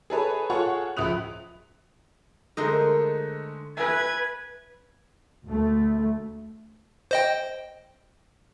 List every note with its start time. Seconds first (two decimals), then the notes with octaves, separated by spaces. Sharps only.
0.10 G#4 A4 B4 C#5
0.50 F4 G#4 A4 C#5 F#5 C#6
0.97 C#2 F3 E5 D#6 F#6 F7
2.57 D3 G#3 A3 A#4 C5 D#5
3.77 B4 E5 G#5 G#6
5.46 D2 A3
7.11 C5 D#5 G5